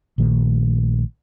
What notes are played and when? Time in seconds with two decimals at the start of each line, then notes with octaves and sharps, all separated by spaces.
0.18 A#1 A#2 D#3 A3